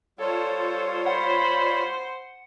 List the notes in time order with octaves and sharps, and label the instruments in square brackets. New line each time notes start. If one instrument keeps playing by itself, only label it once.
[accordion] G3 F4 C#5 [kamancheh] A4 C5
[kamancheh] C5 [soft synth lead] F#5 [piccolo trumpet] B5